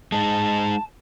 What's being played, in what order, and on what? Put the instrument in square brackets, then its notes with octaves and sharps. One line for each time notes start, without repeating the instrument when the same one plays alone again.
[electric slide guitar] G#3 D#4 [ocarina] A5